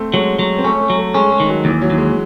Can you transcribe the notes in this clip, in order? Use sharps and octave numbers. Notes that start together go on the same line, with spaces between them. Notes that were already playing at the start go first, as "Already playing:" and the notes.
Already playing: A3 C4
F#3 G#3
F#3
C4
A3 C#4
A3
F#3
A3
G#3 C#4
G#3
D#3
F#3
D#2 E3
F#3
D#2
G#3